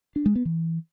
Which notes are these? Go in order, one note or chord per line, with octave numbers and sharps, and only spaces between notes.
D4
G#3
B3
E3